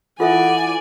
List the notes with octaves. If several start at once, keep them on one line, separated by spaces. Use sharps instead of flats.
E3 F4 A4 D5 E5 F#5 G#5